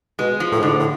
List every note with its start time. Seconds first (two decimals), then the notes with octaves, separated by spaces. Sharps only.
0.19 B2 G#3
0.40 F3
0.52 A2
0.59 G#2
0.63 D3
0.68 A2
0.79 A2